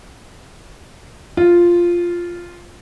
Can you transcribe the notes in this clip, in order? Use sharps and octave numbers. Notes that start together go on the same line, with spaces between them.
F4